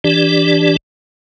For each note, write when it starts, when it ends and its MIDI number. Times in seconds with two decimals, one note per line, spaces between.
0.04 0.76 52
0.04 0.76 62
0.04 0.76 67
0.04 0.76 74